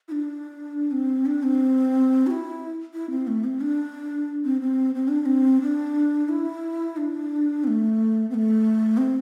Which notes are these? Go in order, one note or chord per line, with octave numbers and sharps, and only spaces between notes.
E4
D4
C4
D4
C4
F#4
E4
E4
C4
A3
C4
D4
C4
C4
C4
D4
D4
C4
D4
E4
D4
C4
A3
C4
A3
C4